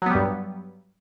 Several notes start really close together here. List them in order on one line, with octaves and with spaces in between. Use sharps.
F#3 B3 G3 G2